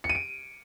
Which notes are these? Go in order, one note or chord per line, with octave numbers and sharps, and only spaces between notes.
C#7
D#7
D7